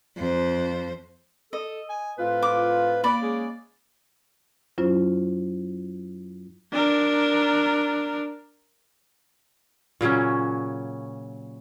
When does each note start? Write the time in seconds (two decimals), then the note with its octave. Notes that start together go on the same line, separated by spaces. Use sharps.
0.17 F2 C5
1.53 A4 D#5
1.90 G#5
2.18 A2 C4 F4 B4
2.43 D6
3.04 A#3 D5 B5
3.21 G#3 C#4 G#4
4.78 F#2 F#3 C#4 E4 F4 C5
6.72 D4 A#4
10.01 A#2 C#3 F#3 C#4